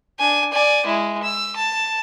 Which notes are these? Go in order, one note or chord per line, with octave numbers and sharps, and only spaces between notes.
D4 G#5
D5 G#5
G#3 E4
E6
A5